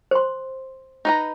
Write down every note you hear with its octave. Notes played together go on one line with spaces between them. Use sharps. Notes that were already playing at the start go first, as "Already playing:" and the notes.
C5 C6
D#4 B4 A#5